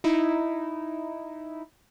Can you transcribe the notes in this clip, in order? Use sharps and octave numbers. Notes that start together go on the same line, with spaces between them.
D#4 E4